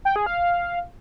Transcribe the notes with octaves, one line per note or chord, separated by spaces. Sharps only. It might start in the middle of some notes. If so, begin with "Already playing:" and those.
G5
G#4
F5